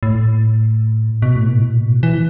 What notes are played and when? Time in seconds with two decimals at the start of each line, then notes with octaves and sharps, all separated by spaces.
0.03 A2
1.22 B2
1.36 A2
1.49 B2
1.62 A2
1.83 B2
2.03 E3